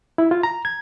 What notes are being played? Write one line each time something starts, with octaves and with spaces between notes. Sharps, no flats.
E4
F4
A#5
G#6